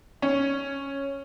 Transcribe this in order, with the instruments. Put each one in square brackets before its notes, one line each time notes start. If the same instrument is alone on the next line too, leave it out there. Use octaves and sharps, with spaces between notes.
[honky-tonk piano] C#4